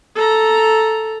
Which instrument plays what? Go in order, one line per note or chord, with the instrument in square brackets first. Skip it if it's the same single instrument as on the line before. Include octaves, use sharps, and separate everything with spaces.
[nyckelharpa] A4 A#5